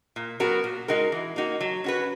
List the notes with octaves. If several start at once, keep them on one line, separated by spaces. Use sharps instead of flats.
A#2
F#3 B3 F#4 A#4
A#2
G#3 D#4 F#4 A#4
E3
A#3 D#4 F#4
F#3
C#4 F#4 B4